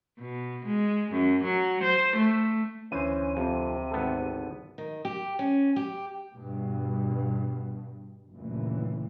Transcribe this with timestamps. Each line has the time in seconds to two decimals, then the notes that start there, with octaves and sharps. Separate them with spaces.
0.20 B2
0.66 G#3
1.12 F#2
1.44 F#3
1.83 C5
2.17 A3
2.92 D2 E3 C#4 C5 D#7
3.37 F2 C3
3.91 G#1 B3 A4
4.78 D#3
5.05 G4
5.39 C#4
5.76 G4
6.35 G2 B2
8.33 F#1 D2 A#2 E3